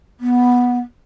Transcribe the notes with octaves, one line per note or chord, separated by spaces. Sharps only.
B3